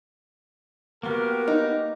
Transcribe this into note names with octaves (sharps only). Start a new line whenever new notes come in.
A#3 B3 F#4 G4 A#4
D#4